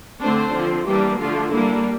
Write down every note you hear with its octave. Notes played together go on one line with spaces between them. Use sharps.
D3 A3 C4 D4 C5
D3 F3 C4
E3 G3 A#3 D4 G4
D3 F3 A3 D4 F4
G3 A#3 D4 E4